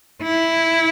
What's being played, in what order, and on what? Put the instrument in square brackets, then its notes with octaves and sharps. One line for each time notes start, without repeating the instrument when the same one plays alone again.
[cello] E4